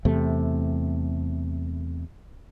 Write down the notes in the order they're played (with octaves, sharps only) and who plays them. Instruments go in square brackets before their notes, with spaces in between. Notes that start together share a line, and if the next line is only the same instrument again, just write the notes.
[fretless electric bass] E2 C3 A3